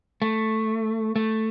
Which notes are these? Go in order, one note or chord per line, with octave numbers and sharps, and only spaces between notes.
A3
A3